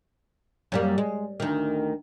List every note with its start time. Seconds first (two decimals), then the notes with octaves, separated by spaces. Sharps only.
0.72 F#2 G3 A#3
0.98 G#3
1.40 D2 D#3